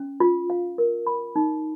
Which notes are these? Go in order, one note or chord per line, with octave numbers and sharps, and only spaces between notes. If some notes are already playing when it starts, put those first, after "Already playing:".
Already playing: C#4
F4
F5
A#4
B5
D#4